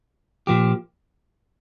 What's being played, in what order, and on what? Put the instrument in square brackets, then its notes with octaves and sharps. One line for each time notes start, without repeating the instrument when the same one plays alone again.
[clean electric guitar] A#2 F3 A#3 G4